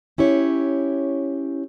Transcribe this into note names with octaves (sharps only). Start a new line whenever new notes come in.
C#4 E4 G4 C#5